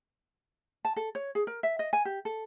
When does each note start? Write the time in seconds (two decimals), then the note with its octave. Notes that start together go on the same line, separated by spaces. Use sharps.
0.85 A5
0.96 A4
1.15 C#5
1.35 G#4
1.47 A#4
1.63 E5
1.79 D#5
1.93 G#5
2.05 G4
2.25 A4